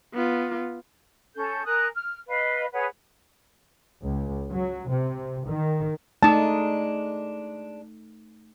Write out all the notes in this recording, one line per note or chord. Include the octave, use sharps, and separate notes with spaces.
B3 F4
C#4 A4 G6
A#4 G#5 D#6 F#6
F6
B4 D#5 F5
G#4 B4 C#5 F#5
C#2
F#3
C3
D#3
G#3 A3 D4 D#4 A5